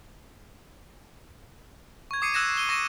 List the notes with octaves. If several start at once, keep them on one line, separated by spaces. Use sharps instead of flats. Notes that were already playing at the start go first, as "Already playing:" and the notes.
C#6 G#6
D6 D#6 C7 C#7 D#7
E6 F#6 G#6 A#6 E7
D#7 G7
C#6 A#6 D#7 E7